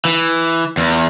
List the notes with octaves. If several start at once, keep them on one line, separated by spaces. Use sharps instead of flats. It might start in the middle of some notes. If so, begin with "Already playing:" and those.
E3
E2